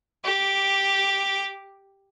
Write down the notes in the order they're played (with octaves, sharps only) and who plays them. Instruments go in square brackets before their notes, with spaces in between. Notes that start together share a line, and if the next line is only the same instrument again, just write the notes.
[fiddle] G4 D6